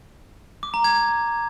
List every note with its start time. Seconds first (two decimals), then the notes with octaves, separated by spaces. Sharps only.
0.63 D6
0.74 A#5
0.84 G#6